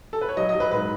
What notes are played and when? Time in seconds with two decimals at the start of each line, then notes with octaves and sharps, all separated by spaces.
0.13 A4
0.21 B4
0.29 C#5
0.37 F#3 D#5
0.49 D#5
0.55 F#3
0.60 B4
0.71 G#2 B4